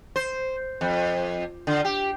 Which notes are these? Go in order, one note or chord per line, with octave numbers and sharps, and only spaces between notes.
C5
F2
D3
G4